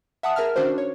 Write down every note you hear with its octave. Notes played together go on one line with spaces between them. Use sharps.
E5 F#5 A5 D#6
G#4 A#4 E5 A5 F6
D#3 C#4 D4 F#4 C5
C#5